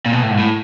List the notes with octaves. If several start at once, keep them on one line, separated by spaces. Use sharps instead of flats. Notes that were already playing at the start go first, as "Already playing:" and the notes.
A#2
B2
A2
G#2
A2